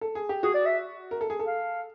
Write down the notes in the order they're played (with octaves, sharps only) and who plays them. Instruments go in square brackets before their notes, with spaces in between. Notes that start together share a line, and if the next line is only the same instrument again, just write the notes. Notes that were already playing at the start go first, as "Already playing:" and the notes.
[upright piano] A4
G#4
G4
[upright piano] F#4 [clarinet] G#4
[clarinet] D5
E5
[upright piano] A#4
A4
G#4
A4
[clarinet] F5